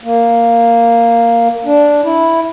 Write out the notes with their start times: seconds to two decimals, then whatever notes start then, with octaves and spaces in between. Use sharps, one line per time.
0.04 A#3
1.65 D4
2.04 E4